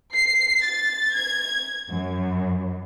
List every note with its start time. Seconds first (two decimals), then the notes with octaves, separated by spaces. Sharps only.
0.14 C7
0.62 A6
1.13 G#6
1.90 F#2